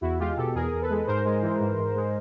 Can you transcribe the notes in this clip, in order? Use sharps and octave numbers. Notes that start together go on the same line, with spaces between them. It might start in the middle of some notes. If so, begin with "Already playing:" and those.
E2 E4 F#4
G#3 F4 G4
B2 G4 A4
E2 G#4 A#4
E2
A4 B4
G#3
G#2 A#4 C5
G#3
E3
G#2
G#2
G#3